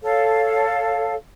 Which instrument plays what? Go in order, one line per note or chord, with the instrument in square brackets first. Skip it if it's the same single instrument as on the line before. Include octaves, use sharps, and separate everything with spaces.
[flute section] A4 C#5 F5